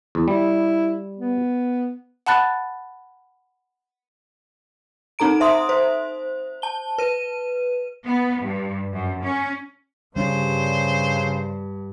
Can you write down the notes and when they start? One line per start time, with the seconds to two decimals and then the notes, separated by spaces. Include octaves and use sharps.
0.15 E2
0.28 G3 E4
1.17 B3
2.26 F#5 A5 B5 F#6 A6
5.19 C4 D#4 A4 A#5 D7
5.40 C5 E5 C6 D#6
5.69 C5
6.62 A5 G7
6.98 B4 D#7
8.05 B3
8.42 G2
8.93 F#2
9.24 C#4
10.16 G2 C#3 G3 D4 C5